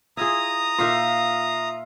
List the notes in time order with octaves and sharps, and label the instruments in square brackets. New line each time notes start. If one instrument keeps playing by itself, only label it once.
[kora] E4 F4 G#4 [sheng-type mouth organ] A#5 D#6
[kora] A#2 D#4 A#4 [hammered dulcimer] E5 F5 C6